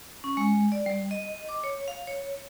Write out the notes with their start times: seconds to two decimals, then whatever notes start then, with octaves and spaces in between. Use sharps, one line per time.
0.24 C#4
0.37 G#3
0.72 D5
0.86 G3
1.11 D#5
1.49 D6
1.64 C#5
1.88 F5
2.07 C#5